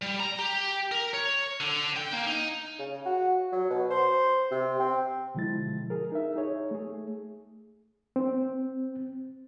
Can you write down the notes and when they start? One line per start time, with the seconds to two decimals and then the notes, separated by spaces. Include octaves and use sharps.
0.02 G3
0.20 A#5
0.39 G4
0.91 A#4
1.14 C#5
1.60 D3
1.97 G5
2.13 A#3
2.27 D#4
2.79 C#3
3.05 F#4
3.52 F#3
3.70 B2
3.90 C5
4.51 C3
4.79 C4
5.35 B2 D3 F3 G#3 E4 A6
5.90 G#4 A#4
6.12 D#4 A#4 E5
6.36 D#4 G#4 C#5
6.71 A3 G#4
8.16 C4